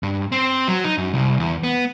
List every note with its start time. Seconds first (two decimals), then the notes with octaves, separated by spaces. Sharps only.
0.03 G2
0.32 C4
0.68 F#3
0.84 D#4
0.98 F#2
1.14 C2
1.40 E2
1.64 B3